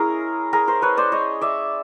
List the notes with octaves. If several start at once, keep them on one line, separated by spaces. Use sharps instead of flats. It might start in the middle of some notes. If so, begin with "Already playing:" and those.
Already playing: G#3 C#4 E4 G#4 A#4
G#4 A#4
A#4 C5
B4 C#5
C5 D5
C#5 D#5
D5 E5